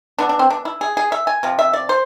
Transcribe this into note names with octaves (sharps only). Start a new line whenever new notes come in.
E3 B3 D4
D4
C4
D4
E4
G#4
G#4
E5
G#5
C3 F3
E5
D5
C5